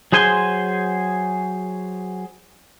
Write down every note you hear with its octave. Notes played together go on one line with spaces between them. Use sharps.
F#3 G#4 C5 G#5 C6